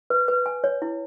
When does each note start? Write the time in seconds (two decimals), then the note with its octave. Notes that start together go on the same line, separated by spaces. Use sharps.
0.10 B4
0.28 B4
0.46 G#5
0.64 C#5
0.82 E4